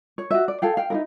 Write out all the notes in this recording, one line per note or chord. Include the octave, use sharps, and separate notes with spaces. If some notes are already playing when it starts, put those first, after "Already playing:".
C#5
F#4 E5
D5
G#4 A4 F5 G5
F5 G5
D#4 E4 A#4